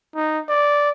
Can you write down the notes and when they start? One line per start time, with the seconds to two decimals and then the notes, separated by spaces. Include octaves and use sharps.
0.15 D#4
0.49 D5